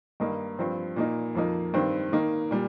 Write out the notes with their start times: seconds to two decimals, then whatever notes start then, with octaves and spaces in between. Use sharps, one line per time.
0.20 G2 D#3 A#3 D#4
0.59 G2 F3 C4
0.96 A#2 A#3 D#4
1.35 F2 F3 A#3 D#4
1.74 G2 D#3 C4
2.12 D#3 A#3 D#4
2.51 A#2 G3